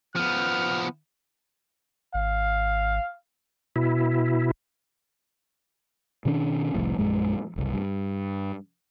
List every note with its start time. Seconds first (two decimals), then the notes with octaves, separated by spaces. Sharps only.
0.16 F3 B3 F6
2.14 G#1 F5
3.76 B2 E4
6.25 B2 D#3 C#4 D4
6.75 F1 C2 F2 A2
6.98 A#1 F#2 G#3
7.56 F#1 C2
7.74 G2